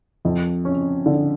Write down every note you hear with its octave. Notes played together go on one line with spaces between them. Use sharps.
F2
C#4
D3